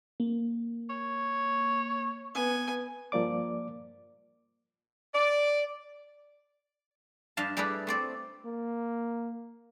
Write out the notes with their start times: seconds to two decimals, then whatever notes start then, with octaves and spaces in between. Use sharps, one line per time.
0.20 A#3
0.90 C#5
2.35 B3 G#5
3.12 G2 F3 A#3 D5 D6
5.13 D5
7.37 G2 G3 D4 D#5 F5 A5
7.57 G3 E4 G#4 A4 B4 D5
7.87 A3 C4 D5
8.45 A#3